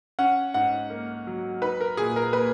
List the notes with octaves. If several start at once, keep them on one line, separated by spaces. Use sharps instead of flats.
C#4 F#5
G#2 F#5
A#3
F#3
D#4 B4
A#4
A#2 G#4
A#4
A#3 B4